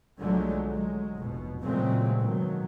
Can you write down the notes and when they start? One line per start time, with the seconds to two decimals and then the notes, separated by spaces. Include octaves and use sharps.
0.20 B1 D3 F3 F#3 G#3 A3
0.70 F#3 G#3
1.15 F1 B2
1.61 A#2 C#3 F#3 G#3 A3 C4
2.20 B2 D#3 F#3